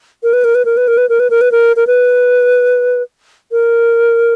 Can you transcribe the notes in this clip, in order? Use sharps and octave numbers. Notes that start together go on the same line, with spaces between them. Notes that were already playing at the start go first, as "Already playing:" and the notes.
A#4
B4
A#4
B4
A#4
B4
A#4
B4
A#4
B4
A#4
B4
A#4
A#4
B4
A#4